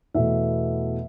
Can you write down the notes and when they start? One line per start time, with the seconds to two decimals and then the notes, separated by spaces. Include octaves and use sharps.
0.14 E2 B2 A3 E5